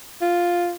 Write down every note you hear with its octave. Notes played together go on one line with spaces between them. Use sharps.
F4